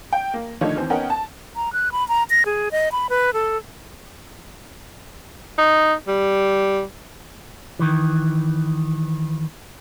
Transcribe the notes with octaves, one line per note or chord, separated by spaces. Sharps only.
G5
A#3
D3 D#3 F3 A3 D#4 C#5
D#2 E3 C4
B3 C#4 D#4 A#4 F#5 G5
A5
A#5
F#6
B5
A#5
A#6
G#4
D#5
B5
B4
A4
D#4
G3
D#3 E3